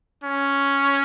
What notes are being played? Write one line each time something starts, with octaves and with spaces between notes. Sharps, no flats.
C#4